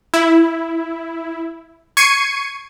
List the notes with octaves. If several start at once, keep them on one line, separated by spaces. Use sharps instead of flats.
E4
C#6 G#6 C7 C#7 D#7